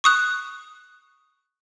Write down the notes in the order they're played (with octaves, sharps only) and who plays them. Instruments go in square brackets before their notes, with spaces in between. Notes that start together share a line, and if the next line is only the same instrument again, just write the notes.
[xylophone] C#6 D#6 F#6